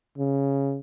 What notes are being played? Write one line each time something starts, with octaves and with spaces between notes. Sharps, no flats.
C#3